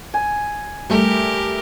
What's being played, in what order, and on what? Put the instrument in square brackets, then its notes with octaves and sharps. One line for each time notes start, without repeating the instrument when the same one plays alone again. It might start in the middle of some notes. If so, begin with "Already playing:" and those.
[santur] G#5
[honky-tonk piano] G3 A3 [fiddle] G4 A#4